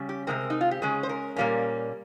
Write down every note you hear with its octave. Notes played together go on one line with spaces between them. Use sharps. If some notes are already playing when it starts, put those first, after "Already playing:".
Already playing: C#3 G3 C#4
G4
C3 D#3 G#3 C4 A#4
D#4
F4
G4
C#3 G#3 C#4 G#4
C5
A#4
A#2 G3 A#3 C#4